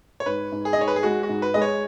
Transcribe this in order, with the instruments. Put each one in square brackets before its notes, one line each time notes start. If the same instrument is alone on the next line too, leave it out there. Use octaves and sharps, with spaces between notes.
[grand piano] C#5
[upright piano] G#2 [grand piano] B4
[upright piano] G#2
[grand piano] G#4
D#5
[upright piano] G#2 [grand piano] C#5
[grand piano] B4
G#4
[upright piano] G#3 [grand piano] F#4
[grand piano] F#4
[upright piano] G#2
[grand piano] B4
[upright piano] G#3 [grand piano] D#5
[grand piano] C#5